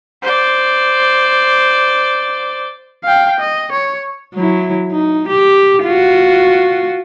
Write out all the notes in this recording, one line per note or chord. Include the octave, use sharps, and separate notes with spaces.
C5 D5
F5 G5
D#5
C#5
F#3 E4
D#4
G4
F4 F#4